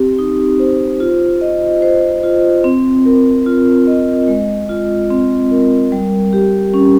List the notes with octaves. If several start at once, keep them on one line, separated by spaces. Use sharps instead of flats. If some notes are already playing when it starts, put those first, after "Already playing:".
Already playing: C4 G4
D#4
C5
F4
D#5
C5
F4
C4
A#4
F4
D#5
G#3
F4
C4
A#4
G3
G4
C#4